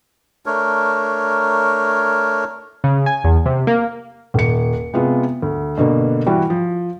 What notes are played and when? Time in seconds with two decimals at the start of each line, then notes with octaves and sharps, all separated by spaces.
0.46 A3 D4 A#4 C#5
2.84 C#3
3.06 G#5
3.24 E2
3.46 C3
3.67 A#3
4.34 D#1 C#7
4.94 C3 G#3 B3 F4
5.42 D2
5.77 G2 B2 D3 A#3
6.26 E3 G3 F#4
6.50 F3